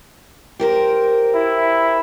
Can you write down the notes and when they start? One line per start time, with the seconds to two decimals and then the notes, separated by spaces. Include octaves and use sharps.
0.60 G4 A#4 C5
1.34 E4